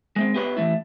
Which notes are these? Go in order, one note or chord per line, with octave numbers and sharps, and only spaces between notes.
G#3 A#3 C4
B3 G4 B4 C#5
E3 A3 E4